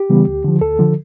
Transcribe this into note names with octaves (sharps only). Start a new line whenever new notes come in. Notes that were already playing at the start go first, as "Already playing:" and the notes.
Already playing: G4
C#3 E3 G3 B3
D2
D3 F3
D2 A4
D3 F3